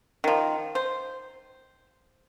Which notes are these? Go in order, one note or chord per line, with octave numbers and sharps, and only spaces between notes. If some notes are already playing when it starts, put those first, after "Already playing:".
D#3 F3
C5